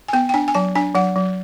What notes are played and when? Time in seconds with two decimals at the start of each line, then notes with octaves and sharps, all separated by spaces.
0.08 G#5
0.13 B3 G5
0.29 G5
0.34 D4 G#5
0.48 G#5
0.55 F#3 A5
0.75 D4 G#5
0.95 F#3 F#5
1.16 F#3